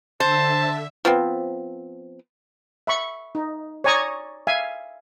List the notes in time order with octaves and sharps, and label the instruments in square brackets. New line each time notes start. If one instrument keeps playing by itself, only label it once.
[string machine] D3 E5 [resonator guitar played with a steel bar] C5 [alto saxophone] A5
[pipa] F3 B3 C4
[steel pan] E5 B5 C#6
D#4
C#5 D5 G#5 A#5 C#6 D#6
E5 F5 G#5